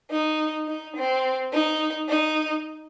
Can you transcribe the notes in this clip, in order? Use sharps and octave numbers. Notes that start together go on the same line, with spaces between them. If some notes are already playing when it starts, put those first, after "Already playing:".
D#4
D#4
C4
D#4
D#4